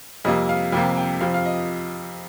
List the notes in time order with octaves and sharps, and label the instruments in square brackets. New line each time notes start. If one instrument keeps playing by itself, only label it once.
[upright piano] F2 C3 G3 A#3 D#5
F5
F2 C3 G3 A#3 G5
G5
F2 C3 F3 F5
F5
D#5